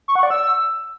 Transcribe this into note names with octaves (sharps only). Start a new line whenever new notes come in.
C#6
F#5
D5
E6